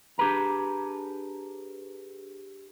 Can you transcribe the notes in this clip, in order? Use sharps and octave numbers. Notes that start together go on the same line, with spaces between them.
D4 G4 G#4 B4 A#5